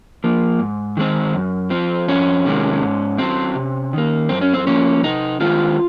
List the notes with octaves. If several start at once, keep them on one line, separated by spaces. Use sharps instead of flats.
F3 A#3
G#2
D#3 G#3 C4
F#2
F3 C4
F2 C#4
C3 D#3 G#3
G#2
F#3 C4
C3
D#3 A#3
F#2 C4
C#4
C4
F3 A#3 C#4
C3 D#4
D#3 G#3 C4 F4